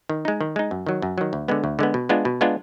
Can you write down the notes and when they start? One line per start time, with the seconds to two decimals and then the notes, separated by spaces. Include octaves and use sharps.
0.09 D#3
0.25 G#3 D#4
0.41 D#3
0.56 G#3 D#4
0.71 F#2
0.87 D#3 F#3
1.02 F#2
1.18 D#3 F#3
1.33 D2
1.48 D3 G#3 B3
1.64 D2
1.79 D3 G#3 B3
1.94 B2
2.09 G#3 B3 D4 F4
2.25 B2
2.41 G#3 B3 D4 F4